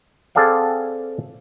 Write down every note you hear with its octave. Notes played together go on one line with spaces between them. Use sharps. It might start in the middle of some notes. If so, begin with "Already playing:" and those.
C4 G#4 A4 D5 F5 F#5